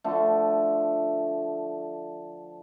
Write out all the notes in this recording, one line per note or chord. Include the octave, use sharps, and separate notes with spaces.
D3 F3 A3